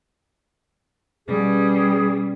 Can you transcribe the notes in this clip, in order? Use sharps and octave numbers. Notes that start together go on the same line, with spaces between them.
B2 G3 C#4 G#4